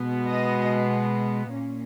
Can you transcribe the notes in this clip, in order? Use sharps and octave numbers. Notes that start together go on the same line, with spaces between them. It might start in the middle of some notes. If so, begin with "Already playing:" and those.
Already playing: B2 G#3 B3
D#5
A#2 A#3 C#4